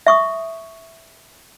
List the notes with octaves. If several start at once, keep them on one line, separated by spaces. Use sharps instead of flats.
E5 C#6 D#6